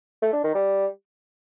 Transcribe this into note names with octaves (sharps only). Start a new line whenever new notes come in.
A3
D4
D#3
G3